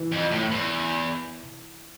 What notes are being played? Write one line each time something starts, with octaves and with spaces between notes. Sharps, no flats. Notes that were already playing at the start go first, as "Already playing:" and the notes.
Already playing: E3
F2
A2
E2